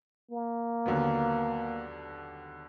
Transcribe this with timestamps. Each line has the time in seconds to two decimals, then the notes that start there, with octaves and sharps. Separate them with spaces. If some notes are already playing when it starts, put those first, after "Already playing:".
0.32 A#3
0.86 D#2 D3 F#3 B3